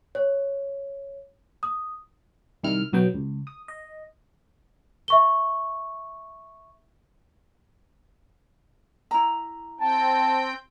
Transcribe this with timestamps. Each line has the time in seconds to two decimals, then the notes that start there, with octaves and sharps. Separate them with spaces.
0.15 C#5
1.63 D#6
2.63 C2 D#3 G3 E4 F6
2.93 B1 F#3 B3 G5
3.14 C#2
3.47 D#6
3.68 D#5
5.08 E5 C#6 G7
9.11 E4 A#5
9.80 C4 G5 A5